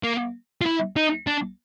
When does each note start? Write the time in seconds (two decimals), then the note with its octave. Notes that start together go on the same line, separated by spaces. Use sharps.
0.03 A#3
0.62 F4
0.66 E4
0.96 D#4
1.27 D4